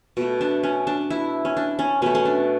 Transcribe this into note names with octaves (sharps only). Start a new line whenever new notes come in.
B2 A3
D4
C#4
D4
E4
C#4
D4
C#4
B2 A3 C#4
C#4
D4